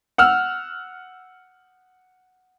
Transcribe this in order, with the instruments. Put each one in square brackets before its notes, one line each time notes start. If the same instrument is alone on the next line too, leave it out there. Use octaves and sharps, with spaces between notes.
[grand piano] F#5 E6 F6